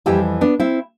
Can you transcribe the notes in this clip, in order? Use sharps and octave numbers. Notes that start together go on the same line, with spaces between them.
F2 E3 G3 E4 G4
B3 D4
C4 E4